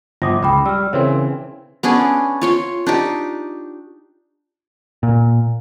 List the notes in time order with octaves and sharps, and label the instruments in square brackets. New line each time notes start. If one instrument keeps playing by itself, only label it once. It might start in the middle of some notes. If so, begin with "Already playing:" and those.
[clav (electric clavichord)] G1 F3 [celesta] D6 D#6 A#6
[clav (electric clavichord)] C#2 [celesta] G5 B5 D6
[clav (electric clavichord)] G3 [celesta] E6 F6
[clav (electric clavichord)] C#3 E3 C4 [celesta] A#4 C#5
[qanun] B3 C#4 D4 G#4
F4 C#5 C6
D4 D#4 G4
[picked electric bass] A#2